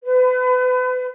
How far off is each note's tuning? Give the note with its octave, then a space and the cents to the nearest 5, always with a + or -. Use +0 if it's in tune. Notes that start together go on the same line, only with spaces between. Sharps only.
B4 +35